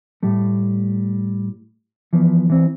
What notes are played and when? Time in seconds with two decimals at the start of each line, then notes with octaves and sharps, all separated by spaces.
0.23 A2 G3 A3
2.13 E3 F3 B3
2.50 E3 C4